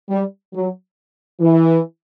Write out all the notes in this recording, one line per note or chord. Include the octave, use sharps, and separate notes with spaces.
G3
F#3
E3